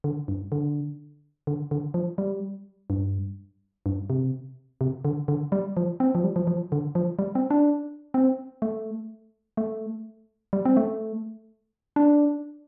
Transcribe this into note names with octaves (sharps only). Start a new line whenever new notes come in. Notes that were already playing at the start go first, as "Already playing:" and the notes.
D3
G2
D3
D3
D3
F3
G3
G2
G2
C3
C3
D3
D3
G3
F3
C4
F3
G3
F3
F3
D3
F3
G3
C4
D4
C4
A3
A3
G3
C4
A3
D4